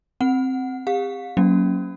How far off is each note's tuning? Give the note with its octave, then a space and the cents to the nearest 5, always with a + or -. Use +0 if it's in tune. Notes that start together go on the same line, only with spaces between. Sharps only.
C4 +0 F#5 +0
G4 +40 F5 +35
F#3 +0 A#3 +5 C#4 +0